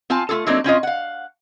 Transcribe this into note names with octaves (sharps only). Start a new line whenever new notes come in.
C4 F4 G#5 A5
A3 F4 G#4 A4
F#3 A3 A#3 C4 D4 D#4
C4 C#4 F4 D#5
F5 F#5